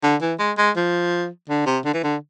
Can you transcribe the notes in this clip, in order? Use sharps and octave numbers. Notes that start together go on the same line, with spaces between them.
D3
E3
G#3
G#3
F3
D3
C3
D3
E3
D3